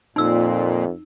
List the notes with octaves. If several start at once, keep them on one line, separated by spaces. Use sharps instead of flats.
F2 A#2 D#4 E6